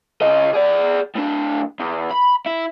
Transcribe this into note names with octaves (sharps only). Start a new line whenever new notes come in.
C#3 D#5
G#4 D5
A2 D4
E2
B5
E4